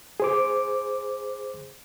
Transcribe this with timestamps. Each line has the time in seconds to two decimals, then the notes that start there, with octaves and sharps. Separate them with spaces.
0.20 G#4 C5 D6